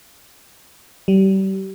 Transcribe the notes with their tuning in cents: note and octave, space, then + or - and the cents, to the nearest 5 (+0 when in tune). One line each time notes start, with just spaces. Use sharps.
G3 -30